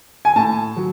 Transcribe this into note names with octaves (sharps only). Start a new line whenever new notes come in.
G#5
A2 A5
F#3